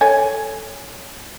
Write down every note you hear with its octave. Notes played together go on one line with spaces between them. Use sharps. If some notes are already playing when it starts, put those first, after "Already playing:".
A4 C#5 G#5